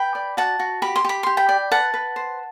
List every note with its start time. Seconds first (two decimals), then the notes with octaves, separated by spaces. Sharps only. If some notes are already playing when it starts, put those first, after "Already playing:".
Already playing: B4 G5 B5
0.15 D5
0.37 F#4 F#5 A5
0.59 F#4
0.82 G4 B5
0.96 C6
1.05 G4 B5
1.23 G4 C6
1.37 G5 B5
1.49 D5
1.71 B4 F#5 A5
1.94 B4
2.16 C5